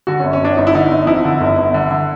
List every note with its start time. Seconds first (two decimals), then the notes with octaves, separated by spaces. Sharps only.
0.07 D3 F#4
0.20 G1 C#4
0.33 C#4
0.41 G1 D4
0.57 G1 D#4
0.67 E4
0.75 D3 D#4
0.91 G1
1.07 F2 E4
1.25 D3
1.41 G1
1.58 G1
1.74 D3
1.91 D3